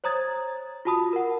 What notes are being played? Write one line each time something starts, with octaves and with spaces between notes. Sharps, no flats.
C5 C#5 A#5 D#6 G#6 A6
F4 F#4 A5 B5 D#6
A#4 F#5